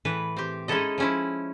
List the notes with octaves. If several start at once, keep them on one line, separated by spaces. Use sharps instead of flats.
A2 E3 B4
C4 G4
G#3 C#4 D#4 E4 A4 D#5
F3 C#4 E4